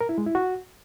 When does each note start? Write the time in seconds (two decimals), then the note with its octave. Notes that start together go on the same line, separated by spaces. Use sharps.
0.01 A#4
0.09 E4
0.18 G#3
0.26 E4
0.35 F#4